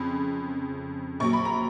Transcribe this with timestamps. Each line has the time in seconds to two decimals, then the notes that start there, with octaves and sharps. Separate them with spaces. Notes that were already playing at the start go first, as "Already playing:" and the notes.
Already playing: F2 C#3 B5
1.20 A#1 A#2 F#3 C#6
1.33 B5
1.45 A#5